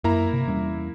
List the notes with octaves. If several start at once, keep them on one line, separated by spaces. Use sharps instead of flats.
F#2 A#3 E4 A#5
C3
E2 G3 C#4